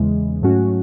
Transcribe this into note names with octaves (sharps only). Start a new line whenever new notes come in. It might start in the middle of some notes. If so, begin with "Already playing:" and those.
Already playing: E2 C#3 E3 G#3
G#2 F#3 A3 C#4 F#4